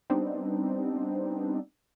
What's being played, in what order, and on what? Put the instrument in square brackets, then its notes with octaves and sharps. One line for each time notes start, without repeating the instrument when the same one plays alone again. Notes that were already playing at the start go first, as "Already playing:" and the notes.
[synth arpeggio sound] G3 B3 C4 D4 D#4